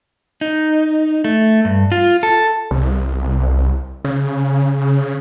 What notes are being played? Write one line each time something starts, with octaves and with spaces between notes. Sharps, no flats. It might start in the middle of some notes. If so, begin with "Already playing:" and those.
D#4
A3
G2
F4
A4
C2
C#3